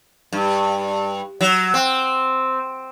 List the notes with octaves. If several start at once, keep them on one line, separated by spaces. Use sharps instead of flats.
G2
F#3
C4